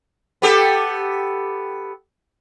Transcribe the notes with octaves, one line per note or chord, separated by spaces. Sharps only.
B3 G4 A4